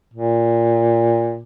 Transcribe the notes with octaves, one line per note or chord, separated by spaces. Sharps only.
A#2